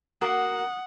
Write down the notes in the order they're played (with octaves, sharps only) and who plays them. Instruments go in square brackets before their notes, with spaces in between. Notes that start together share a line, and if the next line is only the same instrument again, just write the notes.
[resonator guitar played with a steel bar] A#3 F#4 A#4 [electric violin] F#5 [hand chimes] D#6 F#6